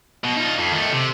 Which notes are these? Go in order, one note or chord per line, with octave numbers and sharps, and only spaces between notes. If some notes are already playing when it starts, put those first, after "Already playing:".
B2
D#4 F4
F2
D#3 A3
C3